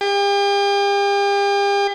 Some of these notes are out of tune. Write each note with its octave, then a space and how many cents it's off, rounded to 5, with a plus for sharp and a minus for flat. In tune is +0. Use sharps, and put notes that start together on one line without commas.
G4 +40